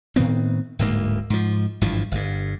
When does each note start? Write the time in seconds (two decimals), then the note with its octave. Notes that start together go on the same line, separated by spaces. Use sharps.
0.16 A2 D#3 B3 C4
0.79 D1 D2 G#2 A#3
1.30 G#2 F3
1.81 G#1 G2 E3 F3
2.12 G1 G2